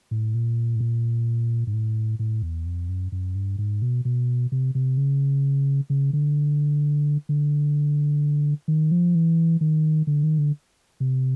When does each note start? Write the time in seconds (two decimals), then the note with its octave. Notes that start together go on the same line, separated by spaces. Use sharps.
0.11 A2
0.35 A#2
0.75 A2
0.80 A#2
1.67 G#2
1.73 A2
2.19 A2
2.43 E2
2.66 F2
2.89 F#2
3.12 F#2
3.35 G2
3.58 G#2
3.82 B2
4.05 B2
4.52 C3
4.75 C3
4.97 C#3
5.90 C#3
6.13 D3
7.29 D3
8.68 D#3
8.91 F3
9.15 E3
9.61 D#3
10.07 D3
10.23 D#3
10.38 D3
11.00 C3